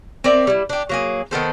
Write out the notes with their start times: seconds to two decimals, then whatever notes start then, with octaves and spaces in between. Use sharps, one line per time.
0.24 C4 A#4 D5 E5
0.47 G3 E4
0.69 D4 G4
0.89 F#3 A#3 G#4
1.31 D#3 B3 A4 C5